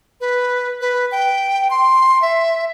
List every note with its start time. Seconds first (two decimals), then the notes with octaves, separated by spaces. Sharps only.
0.21 B4
0.81 B4
1.12 G5
1.70 C6
2.22 E5